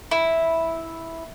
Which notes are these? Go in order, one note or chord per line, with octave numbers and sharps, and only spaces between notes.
E4